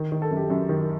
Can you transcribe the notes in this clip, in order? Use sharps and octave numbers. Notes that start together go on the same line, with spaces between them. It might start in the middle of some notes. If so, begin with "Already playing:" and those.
Already playing: D#3
D#3
A4
F#2
G4
F#2
D#3